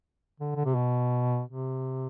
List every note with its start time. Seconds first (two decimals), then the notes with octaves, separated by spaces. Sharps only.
0.40 D3
0.55 D3
0.65 C3
0.75 B2
1.49 C3